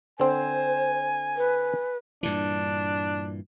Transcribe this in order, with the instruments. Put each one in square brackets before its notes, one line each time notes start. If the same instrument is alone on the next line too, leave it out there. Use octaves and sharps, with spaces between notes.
[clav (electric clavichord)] D3 C4 [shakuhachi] C5 [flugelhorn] G#5
[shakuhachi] B4
[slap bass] G2 A#2 E3 [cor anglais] D4